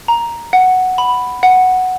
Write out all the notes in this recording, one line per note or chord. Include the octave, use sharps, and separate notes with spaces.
A#5
F#5
B5
F#5